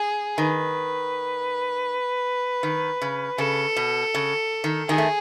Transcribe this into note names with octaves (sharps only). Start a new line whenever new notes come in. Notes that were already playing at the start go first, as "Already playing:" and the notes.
Already playing: G#4
D#3 B4
D#3
C#3
C#3 A4
B2
C#3
D#3
D#3 G#4
A3